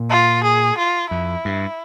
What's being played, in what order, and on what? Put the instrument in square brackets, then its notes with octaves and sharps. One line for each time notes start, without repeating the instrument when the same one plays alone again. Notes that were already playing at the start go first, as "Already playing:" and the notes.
Already playing: [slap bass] A#2
[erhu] F4
G#4
F4
[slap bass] F2 [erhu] E4
[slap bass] G2